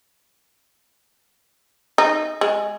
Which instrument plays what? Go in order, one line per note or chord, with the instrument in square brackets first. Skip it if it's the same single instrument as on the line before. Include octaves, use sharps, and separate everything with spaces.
[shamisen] D#4
G#3